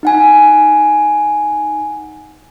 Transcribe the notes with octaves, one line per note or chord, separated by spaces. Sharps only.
D#4 F#5 G#5